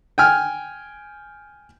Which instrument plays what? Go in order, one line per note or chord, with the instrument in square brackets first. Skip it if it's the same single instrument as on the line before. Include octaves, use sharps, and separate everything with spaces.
[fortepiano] G5 G#5 F6